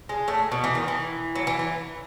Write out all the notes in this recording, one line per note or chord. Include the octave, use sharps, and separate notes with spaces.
G#3
A2 A3
B2 B3
E3
D#3
E3
F#3
E3
E3